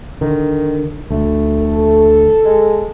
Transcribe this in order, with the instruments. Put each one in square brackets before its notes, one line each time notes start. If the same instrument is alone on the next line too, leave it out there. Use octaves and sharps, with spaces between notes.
[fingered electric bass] D3 [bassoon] D#3
[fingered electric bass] D2 [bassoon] A3
[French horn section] A4
[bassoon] G#3